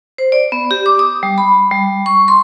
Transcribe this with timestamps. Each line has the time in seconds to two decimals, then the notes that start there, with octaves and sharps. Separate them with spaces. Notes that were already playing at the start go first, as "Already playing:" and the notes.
0.18 C5
0.32 D5
0.52 B3
0.71 G4
0.86 D6
0.99 D#6
1.23 G3
1.38 B5
1.71 G3
2.06 C#6
2.28 C6